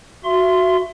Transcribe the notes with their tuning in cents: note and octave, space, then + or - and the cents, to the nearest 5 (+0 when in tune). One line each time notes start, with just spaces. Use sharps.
F#4 +0 E5 +30 C6 +0